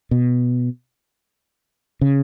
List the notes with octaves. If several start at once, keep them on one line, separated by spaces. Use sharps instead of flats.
B2
C#3